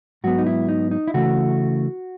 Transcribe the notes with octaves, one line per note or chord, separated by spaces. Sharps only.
G#2 F#3 B3 F#4
D#4
E4
D#4
D#4
E4
C#3 E3 A3 F#4